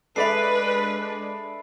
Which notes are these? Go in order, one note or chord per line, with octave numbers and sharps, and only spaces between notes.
G#3 D4 A4 B4 D5 E5 B5 C7